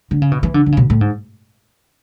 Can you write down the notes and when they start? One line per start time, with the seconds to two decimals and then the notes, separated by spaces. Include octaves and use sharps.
0.11 D3
0.22 C#3
0.32 B2
0.43 E3
0.54 D3
0.66 D3
0.72 C#3
0.77 B2
0.90 A2
1.01 G#2